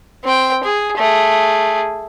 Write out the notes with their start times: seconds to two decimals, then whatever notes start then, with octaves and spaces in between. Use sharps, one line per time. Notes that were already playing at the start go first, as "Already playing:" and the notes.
0.24 C4 G5
0.63 G#4
0.97 A3 G#4